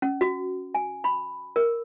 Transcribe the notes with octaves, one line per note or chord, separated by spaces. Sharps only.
C#4
F#4
G#5
B5
A#4